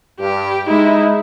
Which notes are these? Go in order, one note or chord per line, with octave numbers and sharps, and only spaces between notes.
G2 G4
G#3 D#4 E4